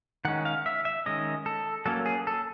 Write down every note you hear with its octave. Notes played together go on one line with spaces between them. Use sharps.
D#3 G#3 C#4 F#5
F5
E5
E5
D#3 G#3 C#4 D#5
A4
F#3 A#3 C#4 A4
G#4
A4